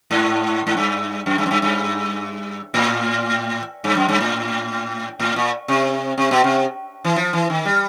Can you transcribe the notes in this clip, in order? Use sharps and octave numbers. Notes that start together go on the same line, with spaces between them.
G#2
G#2
G2
F#2
G2
F#2
G2
G2
A2
G2
F#2
G2
A2
A2
A#2
C3
C3
B2
C3
E3
F3
E3
D#3
G3